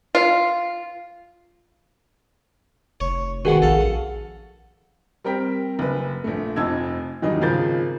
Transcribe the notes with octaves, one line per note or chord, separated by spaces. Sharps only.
F4
F1 C#5
B2 D#3 F#4 G#4 F#5
A#1 A4 F5
F#5
G3 C4 A#4 G5 B6
F#1 B4
A#1 A3
F1 F2 D#5 A5 E6 G#6
D#1 E2 D#3 F#3 G3 D#5
G#1 C#3 F3 A#4 G6 A6